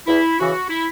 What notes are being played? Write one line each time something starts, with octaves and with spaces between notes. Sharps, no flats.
E2 E4
C#3 E3 F#4
E4